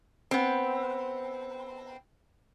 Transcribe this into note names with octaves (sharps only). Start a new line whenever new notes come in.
B3 C4